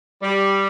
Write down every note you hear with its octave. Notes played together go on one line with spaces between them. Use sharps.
G3